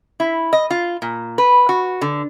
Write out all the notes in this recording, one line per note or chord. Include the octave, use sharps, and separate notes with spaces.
E4
D#5
F4
A#2
B4
F#4
D3